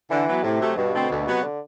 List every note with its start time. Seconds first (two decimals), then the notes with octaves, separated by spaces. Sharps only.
0.10 D3 E3
0.27 F#3 B3
0.43 A2 C3
0.60 F#3 A3
0.77 G2 B2
0.94 D3 A3 C4
1.09 D2
1.26 C3 F#3 B3 F#4
1.43 D3